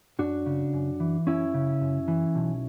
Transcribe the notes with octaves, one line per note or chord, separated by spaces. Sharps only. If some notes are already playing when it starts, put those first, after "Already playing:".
F#2 D4 F#4
C#3
F#2
E3
F#2 C#4 E4
C#3
F#2
E3
B1